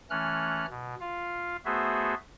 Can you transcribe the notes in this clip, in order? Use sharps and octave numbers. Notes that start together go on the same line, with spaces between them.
E3 A3 C#4 F6 F#6
B2
F4 F5
A3 B3 F#4 G#4 C5 E5